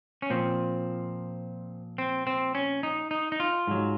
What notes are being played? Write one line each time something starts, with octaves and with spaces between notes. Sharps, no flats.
C#4
A#2 F3 C4
C4
C4
C#4
D#4
D#4
D#4
F4
G#2 F#3